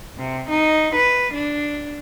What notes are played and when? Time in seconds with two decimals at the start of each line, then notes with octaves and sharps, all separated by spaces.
0.18 C3
0.49 D#4
0.95 B4
1.34 D4